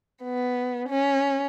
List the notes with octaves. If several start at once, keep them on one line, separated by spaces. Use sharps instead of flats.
B3
C#4